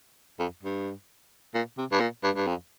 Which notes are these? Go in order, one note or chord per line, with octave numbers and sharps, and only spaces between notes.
F2
G2
A#2
C3
G2
A#2
G2
G2
F2